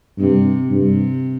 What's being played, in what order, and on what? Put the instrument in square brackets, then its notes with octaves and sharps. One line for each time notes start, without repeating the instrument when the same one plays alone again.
[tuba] G2 [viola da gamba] C3
[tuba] G2 [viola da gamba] C3